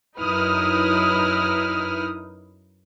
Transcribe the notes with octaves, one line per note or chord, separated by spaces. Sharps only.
F#2 D#4 E4 B4 D#6 F6